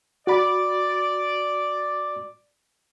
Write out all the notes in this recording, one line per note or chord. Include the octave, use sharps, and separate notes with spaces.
F#4 D5 B5